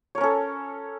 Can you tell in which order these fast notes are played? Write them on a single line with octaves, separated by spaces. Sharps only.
C#5 A#4 C#4 A4